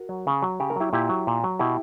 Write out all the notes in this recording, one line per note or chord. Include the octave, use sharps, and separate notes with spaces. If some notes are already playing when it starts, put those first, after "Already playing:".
Already playing: F#4 A#4
F#3
C#3
F#3
C#3 G4
A#4
F#3 E4 G4
A#2 E4 G4
F#3
A#2
F#3
B2 E4 G4